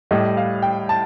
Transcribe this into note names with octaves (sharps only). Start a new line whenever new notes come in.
A2 G3 D#5
F5
G5
A5